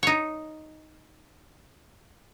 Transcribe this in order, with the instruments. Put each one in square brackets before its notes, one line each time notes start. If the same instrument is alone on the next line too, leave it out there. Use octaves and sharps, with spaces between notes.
[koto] D#4 C#5